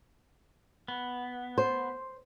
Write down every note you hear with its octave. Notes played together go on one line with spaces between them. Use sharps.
B3
C5